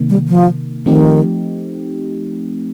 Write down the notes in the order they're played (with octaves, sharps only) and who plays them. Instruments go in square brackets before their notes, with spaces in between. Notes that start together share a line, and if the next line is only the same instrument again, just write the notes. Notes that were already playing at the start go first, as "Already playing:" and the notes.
Already playing: [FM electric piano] C3 D#3 A#3
[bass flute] G3
F3
[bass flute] D#3 [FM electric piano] F3 A3 C4 D#4 G4